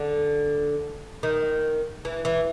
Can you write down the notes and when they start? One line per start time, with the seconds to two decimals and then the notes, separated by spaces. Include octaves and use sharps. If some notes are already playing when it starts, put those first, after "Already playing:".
Already playing: D3
1.23 D#3
2.05 E3
2.25 E3